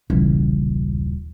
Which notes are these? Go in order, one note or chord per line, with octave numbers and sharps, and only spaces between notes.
D#1 B1 C#3 E3